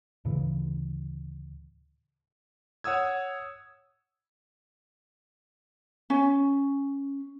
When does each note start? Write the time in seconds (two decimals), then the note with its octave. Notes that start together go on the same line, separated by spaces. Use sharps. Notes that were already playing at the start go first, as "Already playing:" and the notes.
0.25 D2 A2 C#3 E3
2.84 C#5 F#5 D#6 E6 G#6
6.10 C#4